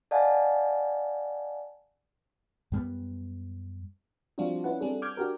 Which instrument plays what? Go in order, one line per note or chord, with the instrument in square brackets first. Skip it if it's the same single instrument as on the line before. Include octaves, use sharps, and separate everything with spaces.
[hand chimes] D5 D#5 F5 F#5 G#5 A5
[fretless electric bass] F#2 G3 B3
[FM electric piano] F3 G3 C4 D4 F4 F#4
C#4 E4 B4 F#5
G3 C4 D4 G#4 A4
D6 F6 G6 G#6
D4 F#4 G4 A#4